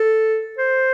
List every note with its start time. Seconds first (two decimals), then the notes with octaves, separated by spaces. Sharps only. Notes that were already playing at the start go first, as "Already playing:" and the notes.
Already playing: A4
0.58 C5